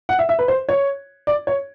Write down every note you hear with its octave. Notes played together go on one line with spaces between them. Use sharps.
F#5
E5
E5
B4
C5
C#5
D5
C#5